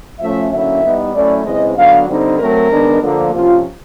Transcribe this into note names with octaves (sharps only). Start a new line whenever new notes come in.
A2 F3 A3 C#4 E5
D3 F#3 A#3 C#4 E4 E5
E3 G3 B3 D#4
F#3 A3 C#4 E4 D5
C#3 E3 G#3 C4 E4 D#5
D3 F#3 B3 D4 F5
D3 G3 C4 D#4
F#3 A3 C4 A#4
D#3 G#3 B3 D4
D3 F3 A#3
C3 F3 A#3 C#4 F4